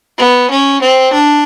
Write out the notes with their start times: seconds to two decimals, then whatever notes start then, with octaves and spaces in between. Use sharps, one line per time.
0.18 B3
0.50 C#4
0.82 C4
1.13 D4